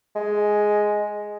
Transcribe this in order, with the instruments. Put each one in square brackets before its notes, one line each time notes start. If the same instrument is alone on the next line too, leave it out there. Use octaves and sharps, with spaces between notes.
[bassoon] G#3